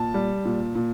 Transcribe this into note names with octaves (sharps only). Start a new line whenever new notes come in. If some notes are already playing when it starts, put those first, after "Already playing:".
Already playing: A#2 A5
G3
A#2
A#2